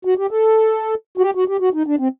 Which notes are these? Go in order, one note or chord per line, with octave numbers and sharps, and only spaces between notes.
F#4
G4
A4
F#4
G4
F#4
G4
F#4
D#4
D4
C4